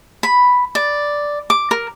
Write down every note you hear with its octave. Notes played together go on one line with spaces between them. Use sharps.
B5
D5
D6
A#4